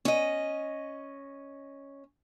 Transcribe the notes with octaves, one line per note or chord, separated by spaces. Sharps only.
C#4 D#5